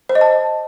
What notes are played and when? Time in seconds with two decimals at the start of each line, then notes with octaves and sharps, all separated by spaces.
0.09 C5
0.15 D#5
0.21 A5